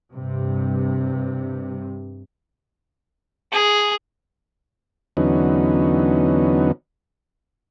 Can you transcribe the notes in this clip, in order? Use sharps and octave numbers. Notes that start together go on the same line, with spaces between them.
G2 C3
G#4
E2 D3 F#3 B3 C#4 D#4